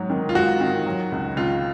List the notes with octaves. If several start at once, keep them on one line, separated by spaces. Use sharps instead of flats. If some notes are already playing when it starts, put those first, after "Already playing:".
Already playing: G#2 F#3
D#3
F4
G#2 F#4
D#3
F#3
C#2
C#2 F4